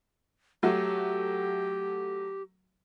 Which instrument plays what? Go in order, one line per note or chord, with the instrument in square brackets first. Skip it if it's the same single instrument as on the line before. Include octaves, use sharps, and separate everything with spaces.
[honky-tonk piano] F#3 A3 F#4 [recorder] G4